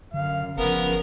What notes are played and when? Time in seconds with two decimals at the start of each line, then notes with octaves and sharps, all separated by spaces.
0.14 F#2 D3 F5
0.58 F#1 C#3 F3 B3 A#4